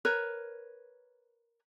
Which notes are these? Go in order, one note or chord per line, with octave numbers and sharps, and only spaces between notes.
A#4 B4 C#5